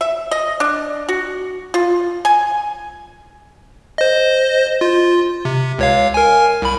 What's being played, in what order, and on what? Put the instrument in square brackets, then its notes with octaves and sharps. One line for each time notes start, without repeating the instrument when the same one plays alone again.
[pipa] E5
D#5
D4
F#4
F4
G#5
[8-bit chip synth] C5 D#5
F4
C3
C#2 C#5 F5
A#4 G#5
C2 B5